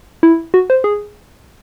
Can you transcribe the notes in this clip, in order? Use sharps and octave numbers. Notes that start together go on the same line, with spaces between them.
E4
F#4
C5
G#4